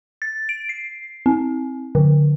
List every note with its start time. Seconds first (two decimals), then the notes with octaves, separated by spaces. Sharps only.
0.22 A6
0.49 D7
0.69 C7
1.26 C4
1.95 D3